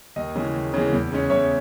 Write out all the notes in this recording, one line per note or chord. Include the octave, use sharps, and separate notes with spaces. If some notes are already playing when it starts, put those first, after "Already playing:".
D#2 D#5
C#3 E3 G#3
D#2
C#3 E3 G#3
E2
C#3 G#3 C#4
E2 C#5 E5